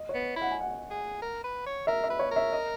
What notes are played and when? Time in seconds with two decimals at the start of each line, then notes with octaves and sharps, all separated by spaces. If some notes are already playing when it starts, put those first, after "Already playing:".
Already playing: D#5
0.09 B3 C#5
0.36 E4
0.42 F#5
0.51 G#5
0.61 F#5
0.90 G#4
1.22 A#4
1.44 B4
1.66 C#5
1.87 A#4 E5
2.04 E5
2.10 B4
2.19 C#5
2.31 A#4
2.36 E5
2.52 D#5